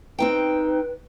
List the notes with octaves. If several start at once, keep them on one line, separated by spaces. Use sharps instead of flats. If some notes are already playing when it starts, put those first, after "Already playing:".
C4 D#4 B4 G5